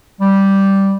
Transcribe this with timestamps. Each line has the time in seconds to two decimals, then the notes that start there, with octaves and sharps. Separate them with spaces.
0.21 G3